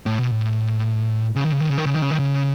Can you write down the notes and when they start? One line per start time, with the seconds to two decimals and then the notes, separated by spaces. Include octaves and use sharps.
0.06 A2
0.18 B2
0.31 A2
1.36 C#3
1.44 D#3
1.52 C#3
1.60 D#3
1.69 C#3
1.78 D#3
1.86 C#3
1.94 D#3
2.02 C#3
2.11 D#3
2.19 C#3